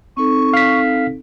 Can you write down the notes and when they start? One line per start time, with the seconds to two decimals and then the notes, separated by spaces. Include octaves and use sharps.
0.17 C4 D#4 A4 C#6
0.53 F5 B6